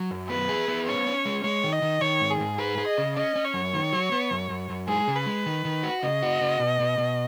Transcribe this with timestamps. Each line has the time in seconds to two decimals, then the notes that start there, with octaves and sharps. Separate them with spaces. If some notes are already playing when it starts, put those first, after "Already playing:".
Already playing: F#3
0.11 F#2
0.29 B3 B4
0.49 G#4
0.68 B3
0.87 C#4 C#5
1.07 C#4
1.25 G#3
1.44 G#3 C#5
1.63 D#3
1.73 D#5
1.82 D#3
2.01 D#3 C#5
2.20 G#2
2.31 G#4
2.40 G#2
2.58 G#4 B4
2.78 G#4
2.88 D#5
2.98 C#3
3.16 C#4 D#5
3.36 C#4
3.45 C#5
3.54 F#2
3.74 D#3
3.93 F#3
4.12 B3
4.31 F#2
4.50 F#2
4.70 F#2
4.88 G#3 G#4
5.08 C#3
5.16 B4
5.26 G#3
5.46 D#3
5.65 D#3
5.83 F#4
6.03 C#3 D#5
6.23 F#4
6.41 C#3
6.60 B2
6.80 B2
6.98 B2